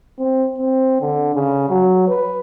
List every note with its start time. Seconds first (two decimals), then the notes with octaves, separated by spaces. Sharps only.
0.19 C4
0.59 C4
1.01 D3
1.35 C#3
1.69 F#3
2.08 B4